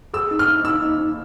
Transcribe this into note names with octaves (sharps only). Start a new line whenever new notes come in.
G#4 E6
D#4
F6
D#4
D#4 E6
D#4
D#4